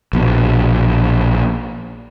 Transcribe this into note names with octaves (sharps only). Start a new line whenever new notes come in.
A#1 B2